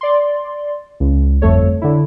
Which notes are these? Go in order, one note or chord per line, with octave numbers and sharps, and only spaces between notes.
D5 C6
C#2
G1 F2 A3 A4 C#5
D3 E4